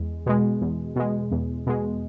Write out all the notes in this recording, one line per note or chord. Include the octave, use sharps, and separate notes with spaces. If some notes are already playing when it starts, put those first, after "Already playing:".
Already playing: E2 G#3
B2 G#3
E2
B2 G#3
E2
B2 G#3